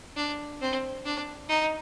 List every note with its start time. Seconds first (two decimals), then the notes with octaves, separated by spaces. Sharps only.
0.16 D4
0.61 C4
1.05 D4
1.49 D#4